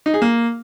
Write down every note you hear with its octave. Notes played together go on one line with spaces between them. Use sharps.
D#4
G#4
A#3